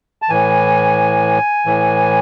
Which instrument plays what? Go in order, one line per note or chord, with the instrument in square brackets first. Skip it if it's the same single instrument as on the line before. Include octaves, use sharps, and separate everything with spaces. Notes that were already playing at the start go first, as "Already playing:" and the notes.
[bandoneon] A5
A2 E3 G#5
A2 E3